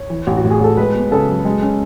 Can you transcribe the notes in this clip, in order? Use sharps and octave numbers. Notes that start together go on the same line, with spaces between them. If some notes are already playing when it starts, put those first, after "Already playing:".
Already playing: C#5
E3
A1
F#4
A2
G#4
A1 A4
G#3 B4
B3
C#3 A4
F#2
G#3
C#4